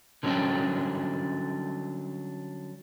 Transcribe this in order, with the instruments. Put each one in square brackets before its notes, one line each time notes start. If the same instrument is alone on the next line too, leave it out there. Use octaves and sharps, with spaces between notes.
[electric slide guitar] D3 F#3 G3 C#4 D4 G5